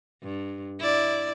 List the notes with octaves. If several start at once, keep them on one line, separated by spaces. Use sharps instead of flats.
G2
E4 D5